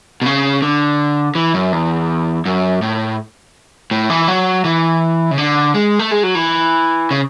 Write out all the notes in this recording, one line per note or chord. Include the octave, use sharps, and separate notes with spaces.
B2
C#3
D3
E3
F#2
E2
F#2
A2
A2
E3
F#3
E3
C#3
D3
G#3
A3
G#3
F#3
E3
C#3